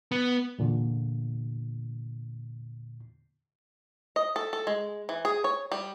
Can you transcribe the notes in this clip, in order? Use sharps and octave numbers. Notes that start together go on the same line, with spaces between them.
B3
E2 A#2 D3
D#5
A4
A4
G#3
E3
G#4
C#5
G3